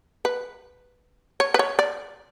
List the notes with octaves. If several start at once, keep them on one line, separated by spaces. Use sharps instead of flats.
B4
C#5
B4
C#5
D5